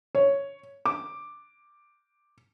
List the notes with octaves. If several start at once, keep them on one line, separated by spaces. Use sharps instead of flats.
C#5
D6